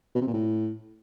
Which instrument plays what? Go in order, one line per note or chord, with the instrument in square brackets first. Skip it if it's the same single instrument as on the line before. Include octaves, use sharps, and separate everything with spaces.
[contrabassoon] B2
C3
A#2
A2